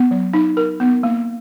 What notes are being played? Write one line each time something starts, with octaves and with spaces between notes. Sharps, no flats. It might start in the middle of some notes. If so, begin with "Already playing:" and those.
Already playing: B3
F#3
D#4
A#4
B3
A#3